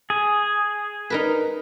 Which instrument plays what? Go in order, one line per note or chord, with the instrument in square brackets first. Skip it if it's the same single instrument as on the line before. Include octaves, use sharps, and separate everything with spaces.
[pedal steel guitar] G#4
[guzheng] D#4 A#4 B4